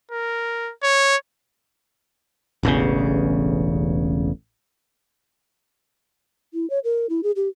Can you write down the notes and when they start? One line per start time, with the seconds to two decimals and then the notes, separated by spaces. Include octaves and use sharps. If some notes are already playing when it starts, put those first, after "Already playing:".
0.12 A#4
0.83 C#5
2.63 E1 A1 E2 C#3
6.54 E4
6.70 C#5
6.84 A#4
7.09 E4
7.23 G#4
7.36 G4